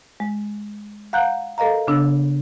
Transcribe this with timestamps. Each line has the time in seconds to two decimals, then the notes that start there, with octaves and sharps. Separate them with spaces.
0.20 G#3
1.13 F5 F#5 A#5 F#6 G6
1.58 A4 A#4 D#5 F5 A#5
1.87 C#3 B3 D4 E6